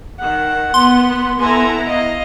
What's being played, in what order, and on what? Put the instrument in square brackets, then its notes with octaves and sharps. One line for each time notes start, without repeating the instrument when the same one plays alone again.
[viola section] D#3 [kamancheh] F#5
[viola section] B3 [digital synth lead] C6
[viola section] B3 E4 A#5 [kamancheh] A4 G#5
[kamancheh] D#5 F5